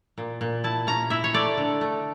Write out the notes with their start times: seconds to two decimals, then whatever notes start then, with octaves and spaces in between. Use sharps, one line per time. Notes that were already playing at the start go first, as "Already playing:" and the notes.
0.18 A#2
0.41 A#2
0.64 E4 A5
0.87 C#4 A#5
1.10 E4 E5
1.24 C#5
1.34 A3 D5
1.57 D3
1.81 A3